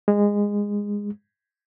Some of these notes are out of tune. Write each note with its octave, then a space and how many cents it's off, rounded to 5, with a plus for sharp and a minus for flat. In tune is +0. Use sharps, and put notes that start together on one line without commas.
G#3 -20